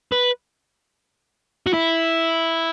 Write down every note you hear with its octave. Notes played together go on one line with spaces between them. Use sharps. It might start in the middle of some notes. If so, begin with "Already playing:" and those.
B4
F#4
E4